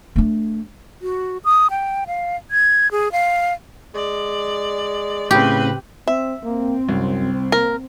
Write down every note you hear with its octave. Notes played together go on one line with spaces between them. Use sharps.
A3 D4
F#4
D#6
G5
F5
G#6
G#4
F5
G#3 D5
A2 C#3 C4 G4 B4
C4 E5
A#3 C4
C2 F#2
A#3 A#4